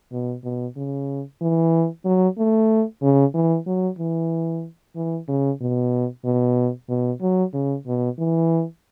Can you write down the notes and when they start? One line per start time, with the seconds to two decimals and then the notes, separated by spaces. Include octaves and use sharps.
0.12 B2
0.44 B2
0.76 C#3
1.42 E3
2.05 F#3
2.38 A3
3.02 C#3
3.34 E3
3.66 F#3
3.99 E3
4.96 E3
5.28 C#3
5.61 B2
6.25 B2
6.89 B2
7.22 F#3
7.54 C#3
7.87 B2
8.19 E3